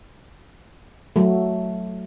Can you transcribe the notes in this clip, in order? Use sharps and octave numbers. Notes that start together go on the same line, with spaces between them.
F#3 A3